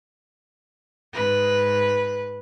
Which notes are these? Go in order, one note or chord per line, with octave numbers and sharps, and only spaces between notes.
G#2 B4